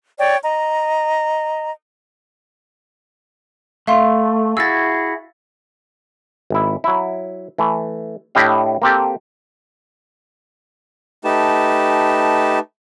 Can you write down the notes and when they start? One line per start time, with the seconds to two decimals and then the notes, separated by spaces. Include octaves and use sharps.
0.18 C#5 D5 G5
0.44 D#5 A#5
3.87 A3 E5 F5 C6
4.57 E4 F#4 G#4 E6 A6
6.50 G#1 E4
6.84 F#3 E4
7.58 E3 A3
8.35 A2 D4 E4 G4 D#5 F5
8.82 A#3 C4 G4 A4
11.24 A3 D#4 G4 B4 A5